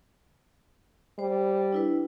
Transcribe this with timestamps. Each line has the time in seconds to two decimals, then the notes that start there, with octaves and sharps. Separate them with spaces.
1.19 G3 C5
1.72 D4 E4 B4